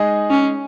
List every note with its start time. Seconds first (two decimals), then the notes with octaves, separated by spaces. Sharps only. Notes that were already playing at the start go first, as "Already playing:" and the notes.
Already playing: G#3 D#4 G#4 D#5
0.31 C#4